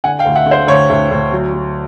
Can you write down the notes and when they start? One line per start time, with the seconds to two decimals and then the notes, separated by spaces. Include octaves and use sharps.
0.04 D3 F#5 G#5
0.19 F5 G5
0.25 D2
0.35 E5 F#5
0.46 D3
0.51 C5
0.67 D2 C#5
0.89 D2
1.11 D2
1.32 F#3
1.53 F#3